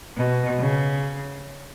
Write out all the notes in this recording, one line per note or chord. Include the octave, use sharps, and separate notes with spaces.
B2
C#3